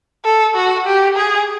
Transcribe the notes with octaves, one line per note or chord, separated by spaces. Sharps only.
A4
F#4
G4
G#4